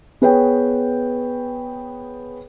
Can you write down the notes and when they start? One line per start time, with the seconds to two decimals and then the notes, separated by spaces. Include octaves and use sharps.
0.21 B3 G#4 B4 C#5 G5